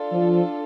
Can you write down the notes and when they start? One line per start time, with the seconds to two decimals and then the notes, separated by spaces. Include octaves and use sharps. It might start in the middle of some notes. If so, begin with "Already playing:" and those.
Already playing: D4 F4 A4
0.13 F3